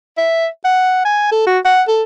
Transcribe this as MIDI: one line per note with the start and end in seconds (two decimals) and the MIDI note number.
0.18 0.47 76
0.65 1.03 78
1.05 1.28 80
1.32 1.47 69
1.47 1.59 66
1.65 1.82 78
1.88 2.03 69